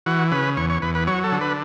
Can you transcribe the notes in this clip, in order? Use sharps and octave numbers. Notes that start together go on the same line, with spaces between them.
E3 F#4
C#3 B4
E2 C#5
C#5
E2 B4
B4
F#3 C#5
A4
D3
B4